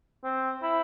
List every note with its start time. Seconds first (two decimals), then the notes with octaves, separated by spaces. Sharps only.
0.24 C4
0.62 E4